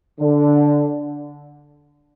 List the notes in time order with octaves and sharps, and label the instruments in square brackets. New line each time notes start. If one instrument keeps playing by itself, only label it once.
[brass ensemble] D3